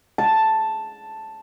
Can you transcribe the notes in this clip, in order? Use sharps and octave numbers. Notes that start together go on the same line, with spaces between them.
A5